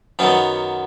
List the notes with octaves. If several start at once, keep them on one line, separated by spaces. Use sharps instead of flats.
F#2 D#3 F#3 B3 C#4